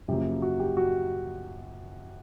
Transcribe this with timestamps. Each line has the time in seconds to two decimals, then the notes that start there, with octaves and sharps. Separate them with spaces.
0.08 F#2 C#3 F3 A#3 G4
0.42 F#4
0.60 G4
0.77 F#4